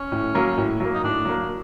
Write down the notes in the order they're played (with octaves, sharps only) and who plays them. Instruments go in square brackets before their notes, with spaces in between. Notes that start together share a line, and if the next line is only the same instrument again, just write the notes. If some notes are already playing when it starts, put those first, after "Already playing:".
Already playing: [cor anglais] C#4
[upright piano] A2
F#3 A#3
A2
F#3 A#3
[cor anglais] D#4
[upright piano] A2 [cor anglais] D4
[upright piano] F#3 A#3